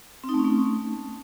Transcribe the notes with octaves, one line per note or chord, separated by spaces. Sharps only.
C4
D#4
A3
C#4
A3